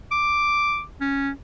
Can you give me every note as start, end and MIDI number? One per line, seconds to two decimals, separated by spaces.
0.12 0.82 86
1.01 1.30 61